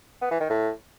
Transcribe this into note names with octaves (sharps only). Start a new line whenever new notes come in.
B3
E3
D#3
A2